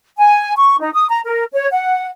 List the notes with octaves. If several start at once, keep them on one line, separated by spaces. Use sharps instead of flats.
G#5
C#6
D#4
D#6
A#5
A#4
C#5
F#5